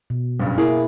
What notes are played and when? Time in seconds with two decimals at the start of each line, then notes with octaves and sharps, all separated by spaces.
0.10 B2
0.40 F#1 G2 C#3
0.58 A#3 E4 G#4